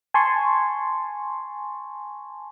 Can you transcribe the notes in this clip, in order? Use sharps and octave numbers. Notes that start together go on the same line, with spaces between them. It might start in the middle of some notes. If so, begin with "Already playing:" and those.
G#5 A5 C6 C#6